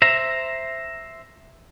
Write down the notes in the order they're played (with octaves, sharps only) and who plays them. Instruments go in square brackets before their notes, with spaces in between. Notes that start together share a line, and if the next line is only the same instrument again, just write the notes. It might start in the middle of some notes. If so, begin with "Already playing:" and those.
[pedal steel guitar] C5 E5 A#5